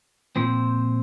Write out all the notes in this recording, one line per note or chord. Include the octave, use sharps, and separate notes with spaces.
A#2 F3 C4 C5